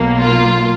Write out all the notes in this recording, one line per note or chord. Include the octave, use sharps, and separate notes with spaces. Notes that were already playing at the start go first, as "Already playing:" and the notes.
Already playing: B1 B2 F#3 A#3
F4